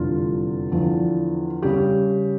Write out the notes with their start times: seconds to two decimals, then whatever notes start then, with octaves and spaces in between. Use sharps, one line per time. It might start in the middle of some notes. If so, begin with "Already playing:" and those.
Already playing: F1 E2 D3 G3 F4
0.72 E2 D3 F3
1.63 C#3 G3 G4